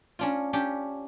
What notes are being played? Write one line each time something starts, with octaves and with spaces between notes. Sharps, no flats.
C#4 D4 F4
C#4 D4 G4